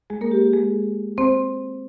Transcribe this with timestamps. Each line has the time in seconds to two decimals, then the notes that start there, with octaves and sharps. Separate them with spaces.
0.10 G#3 G#4
0.21 A#3 A#4
0.32 G4
0.42 G4
0.53 G#3 G#4
1.18 C4 C5